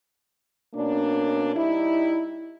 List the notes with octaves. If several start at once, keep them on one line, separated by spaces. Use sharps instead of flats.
B2 A#3 C#4 D4
G3 D#4 E4